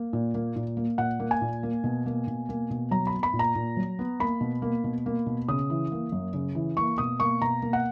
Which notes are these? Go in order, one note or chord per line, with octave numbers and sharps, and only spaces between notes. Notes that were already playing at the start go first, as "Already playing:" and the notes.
Already playing: A#3
A#2
A#3
A#2
A#3
A#2 F#5
A#3
G#5
A#2
A#3
B2
A#3
B2
A#3
B2
F#3 A#5
B5
B3
B5
A#2
A#5
A#2
F#3
B3
A#3 B5
B2
A#3
B2
A#3
B2
C#3 D#6
E3
A#3
F#2
C#3
E3
A#3 C#6
B2 D#6
A#3 C#6
B2 A#5
A#3
F#5